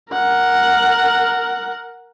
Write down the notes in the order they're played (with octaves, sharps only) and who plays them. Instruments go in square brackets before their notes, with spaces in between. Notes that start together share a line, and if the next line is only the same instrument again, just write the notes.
[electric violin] A#4 F#5